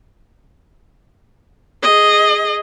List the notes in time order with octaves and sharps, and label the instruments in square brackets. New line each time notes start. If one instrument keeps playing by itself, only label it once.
[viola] G#4 D#5